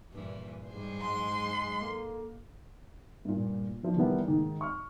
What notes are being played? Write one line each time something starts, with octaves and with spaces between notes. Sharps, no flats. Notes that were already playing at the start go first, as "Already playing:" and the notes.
G2 A#2 E3
G#2 G3 G#4 C5
F#3 G#3 C6
A#3 A4
G2 A#2
E3 F3 D4
D#3 E3 G3 A#3 B3 D4
G#2 D#3
C#6 F6